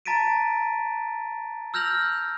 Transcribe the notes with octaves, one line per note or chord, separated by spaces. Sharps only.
A5 A#5 A6 B6 D7 D#7
E6 F6 G6 A#6 F7 F#7